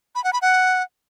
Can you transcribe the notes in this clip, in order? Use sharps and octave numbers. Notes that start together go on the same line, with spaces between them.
B5
F#5
B5
F#5